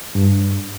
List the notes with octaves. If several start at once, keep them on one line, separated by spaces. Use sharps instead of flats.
G2